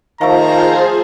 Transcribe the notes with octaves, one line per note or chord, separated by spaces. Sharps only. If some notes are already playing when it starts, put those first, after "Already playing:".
D#3 F3 A3 F4 G#4 C5 A#5